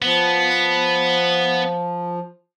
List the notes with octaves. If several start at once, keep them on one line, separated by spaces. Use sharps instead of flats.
F3 B3